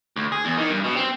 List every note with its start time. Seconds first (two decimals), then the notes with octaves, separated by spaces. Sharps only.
0.16 D2
0.32 G#4
0.45 E2
0.58 D#3
0.70 G2
0.84 B2
0.96 C4